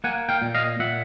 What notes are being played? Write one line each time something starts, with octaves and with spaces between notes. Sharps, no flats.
A#3 F#5 G#5
F5 G5
A#2
D#5 F5
A#2 E5 F#5